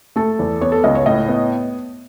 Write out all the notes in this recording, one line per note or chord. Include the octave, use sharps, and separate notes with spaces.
A3 A4
E2
B3 C#5
A4
C#2 D#5
C#5
A2 D#5
B3